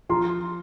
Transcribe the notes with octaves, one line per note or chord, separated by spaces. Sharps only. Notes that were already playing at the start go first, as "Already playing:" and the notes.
F3 A#5 C6